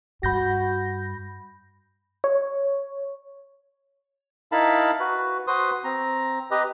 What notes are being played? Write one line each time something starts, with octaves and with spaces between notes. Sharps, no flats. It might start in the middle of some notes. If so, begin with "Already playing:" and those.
G2 F#4 B5 G6 A#6
C#5
D#4 E4 A#4 F5 A5 B5
F#4 B4
F#4 B4 C5 C6 D#6
C4 A#5
G4 B4 D#5 A#5